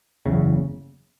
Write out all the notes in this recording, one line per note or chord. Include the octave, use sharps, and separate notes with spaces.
F#1 E2 C#3